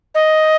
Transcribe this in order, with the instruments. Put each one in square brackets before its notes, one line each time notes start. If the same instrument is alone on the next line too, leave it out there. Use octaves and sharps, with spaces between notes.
[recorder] D#5